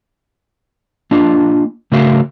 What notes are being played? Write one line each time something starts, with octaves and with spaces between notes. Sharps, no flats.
A#3 D4 F4 D#5
C#3 A3 F#4 A#4 E5 F5